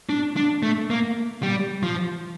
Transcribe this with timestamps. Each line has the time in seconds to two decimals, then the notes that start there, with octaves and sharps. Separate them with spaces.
0.09 D4
0.36 D4
0.63 A3
0.90 A#3
1.43 G3
1.83 F3